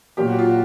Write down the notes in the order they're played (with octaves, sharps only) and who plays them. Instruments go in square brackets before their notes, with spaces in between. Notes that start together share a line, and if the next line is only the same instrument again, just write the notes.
[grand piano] A#2 F#3 A#3 [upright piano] G4
[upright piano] F#4
F4
F#4